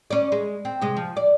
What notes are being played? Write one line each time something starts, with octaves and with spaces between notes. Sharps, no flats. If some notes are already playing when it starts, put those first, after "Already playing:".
C#4 D5
G#3
C4
C3 G#3
F3
D5